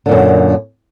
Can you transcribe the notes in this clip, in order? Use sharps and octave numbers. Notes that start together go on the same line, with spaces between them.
F#2 A#2 D3